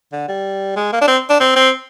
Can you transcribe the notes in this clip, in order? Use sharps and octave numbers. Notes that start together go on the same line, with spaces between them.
D3
G3
G#3
A#3
D4
C4
D4
C4
C4